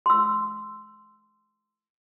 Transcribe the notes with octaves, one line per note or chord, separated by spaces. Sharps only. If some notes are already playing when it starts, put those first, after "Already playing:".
C6 E6